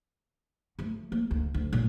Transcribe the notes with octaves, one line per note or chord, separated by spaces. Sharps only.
F3 A3
A#3
D2
D2
A1 A#2